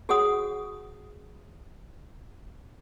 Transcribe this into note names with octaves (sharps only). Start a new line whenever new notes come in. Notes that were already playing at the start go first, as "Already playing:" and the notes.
F#4 G#4 C#5 F#5 D#6